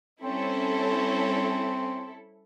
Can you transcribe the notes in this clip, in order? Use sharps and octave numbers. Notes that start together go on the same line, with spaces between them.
G3 C4 C#4 E4 A4 C5